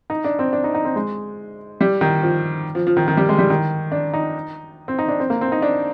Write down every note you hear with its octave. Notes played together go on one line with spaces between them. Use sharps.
D#4
D4
C4
D4
D#4
D#4
C4
G#3
G3
D#3
F3
F3
F3
D#3
D#3
G3
G#3
G3
D#3
D4
D#4
C4
D#4
D4
C4
A#3
C4
D#4
D4